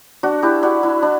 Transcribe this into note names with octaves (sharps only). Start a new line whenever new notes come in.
D4 F#4
E4 G4
D4 F#4
E4
D4